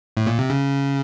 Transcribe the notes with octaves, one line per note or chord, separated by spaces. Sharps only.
A2
A#2
C3
C#3